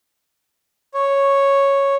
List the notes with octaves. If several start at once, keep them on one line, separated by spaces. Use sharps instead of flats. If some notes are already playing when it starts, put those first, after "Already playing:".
C#5